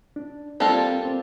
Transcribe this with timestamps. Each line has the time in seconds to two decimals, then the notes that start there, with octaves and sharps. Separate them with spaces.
0.16 D4
0.60 G3 A#3 C4 D4 F4 A4
1.05 C4